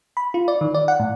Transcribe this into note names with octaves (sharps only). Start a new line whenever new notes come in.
B5
F4
D5
D#3
D5
F#5
A2